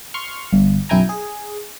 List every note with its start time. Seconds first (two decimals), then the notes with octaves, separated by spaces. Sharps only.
0.14 C6 C#6 F6
0.53 G1
0.89 B1 F#2 E4 G5 G#5 A#5
1.09 G#4